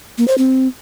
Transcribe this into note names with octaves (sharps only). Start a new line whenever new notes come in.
A#3
C5
C4